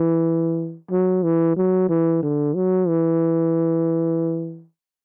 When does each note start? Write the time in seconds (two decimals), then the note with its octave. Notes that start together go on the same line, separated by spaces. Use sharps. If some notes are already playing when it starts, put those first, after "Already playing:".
Already playing: E3
0.91 F#3
1.23 E3
1.56 F#3
1.89 E3
2.23 D3
2.55 F#3
2.88 E3